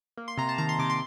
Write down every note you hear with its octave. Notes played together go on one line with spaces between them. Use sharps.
A#3
C6
C3 A#5
A5
D#3 A#5
C6
C3 D6
C6